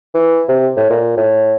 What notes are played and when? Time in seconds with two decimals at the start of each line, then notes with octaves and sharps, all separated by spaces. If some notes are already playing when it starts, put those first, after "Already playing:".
0.14 E3
0.49 C3
0.77 A2
0.90 A#2
1.17 A2